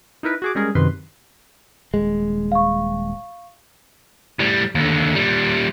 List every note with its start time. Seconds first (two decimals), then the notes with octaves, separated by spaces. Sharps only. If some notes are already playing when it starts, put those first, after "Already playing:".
0.23 D#4 E4 A#4 B4
0.42 F#4 G#4 D6
0.55 G3 G#3 C#4 G#4 A#4
0.75 F#2 C3 D#3 B4 C6
1.94 D#1 G#3
2.52 F5 C#6
4.39 A2 G3
4.75 D#2 D3
5.15 A#2 G3